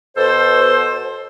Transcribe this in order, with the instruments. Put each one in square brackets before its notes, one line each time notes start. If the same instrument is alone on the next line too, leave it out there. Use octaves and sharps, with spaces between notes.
[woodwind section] B2 A4 C5